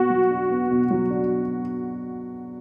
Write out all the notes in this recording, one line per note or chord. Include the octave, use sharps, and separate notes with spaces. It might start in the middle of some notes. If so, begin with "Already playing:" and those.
Already playing: B2 B3 F#4
F#3
D4
B3
B2
F#3
D4